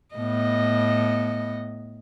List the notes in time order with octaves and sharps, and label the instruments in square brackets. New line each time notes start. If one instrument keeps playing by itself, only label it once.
[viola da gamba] A2 B3 D#5